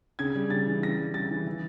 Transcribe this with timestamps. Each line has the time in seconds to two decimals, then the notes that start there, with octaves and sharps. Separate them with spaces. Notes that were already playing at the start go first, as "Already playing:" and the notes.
0.19 C#3 G#6
0.35 G3
0.50 C#3 A6
0.67 E3
0.83 C#3 A#6
0.98 G3
1.14 C#3 A6
1.31 E3
1.47 E3